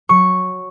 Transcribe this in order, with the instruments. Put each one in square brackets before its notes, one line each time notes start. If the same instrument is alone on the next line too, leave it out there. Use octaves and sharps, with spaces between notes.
[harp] F#3 C#6